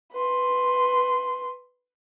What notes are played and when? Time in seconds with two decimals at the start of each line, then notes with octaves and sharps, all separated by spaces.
0.13 B4 C6